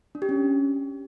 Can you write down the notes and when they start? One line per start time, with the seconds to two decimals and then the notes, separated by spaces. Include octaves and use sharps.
0.15 D4
0.22 G4
0.29 C#4